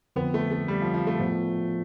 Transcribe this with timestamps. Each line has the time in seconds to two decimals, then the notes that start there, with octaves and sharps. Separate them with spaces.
0.16 F2 D3 F3 B3 C4
0.34 A3
0.51 A3
0.68 G3
0.82 F3
0.94 F3
1.07 A3
1.19 A2 F3 B3 F4